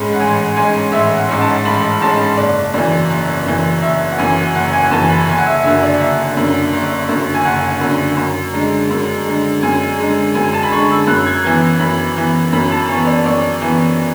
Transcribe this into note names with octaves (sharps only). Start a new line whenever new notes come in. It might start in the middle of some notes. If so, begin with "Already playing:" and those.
Already playing: A1 G#2 G#3 C#4 B5
F#5
A1 G#5
G#2 G#3 C#4 G#5
A1 E5
F#5
G#2 G#3 C#4
A5
A1 B5
G#2 G#3 C#4 A5
F#1 D5
F#2 E3 D5
F#1
F#2 E3
F#1 E5
F#5
F#2 E3 G#5
F#1 F#5
G#5
F#2 E3 A5
B5
F#1 G#5
F#5
E5
F#2 D3 E5
D5
F#1 E5
F#2 D3
F#1
F#2 D3
G#5
F#1 F#5
F#2 D3
F#2
D3 G#3
F#2
D3 G#3
F#2 G#5
D3 G#3
F#2 G#5
A5
B5
D3 G#3 C#6
E6
F#2 F#6
G#6
E3 B3 G#6
F#2 B5
E3 B3
F#2 B5
A5
E3 B3 C#5
D5
F#2 D5
E3 B3